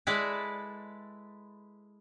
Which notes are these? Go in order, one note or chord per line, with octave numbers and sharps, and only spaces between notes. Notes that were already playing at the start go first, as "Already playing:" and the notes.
G#3 E4 A4 B4 D5